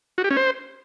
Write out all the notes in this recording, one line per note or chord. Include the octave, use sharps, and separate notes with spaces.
F#4
G4
C#4
C5